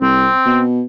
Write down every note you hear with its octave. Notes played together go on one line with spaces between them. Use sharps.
C2 C4
B2